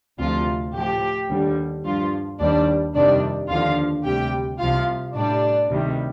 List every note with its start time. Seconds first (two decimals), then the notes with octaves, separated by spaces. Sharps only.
0.19 D2 C3 F3 F4
0.74 A2 F3 G4
1.29 D#2 D3 G3
1.84 G2 F3 F4
2.40 D#2 D#3 G3 D4 D5
2.95 F2 C3 D#3 G3 D4 D5
3.49 D#2 D3 F3 F4 F5
4.05 D2 C3 G3 G4 G5
4.60 C2 C3 F3 F4 F5
5.15 A2 G3 D4 D5
5.71 D2 C3 D#3 G3